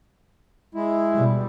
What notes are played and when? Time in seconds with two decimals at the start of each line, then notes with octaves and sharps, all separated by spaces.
0.75 G#3 E4
1.14 B2 G3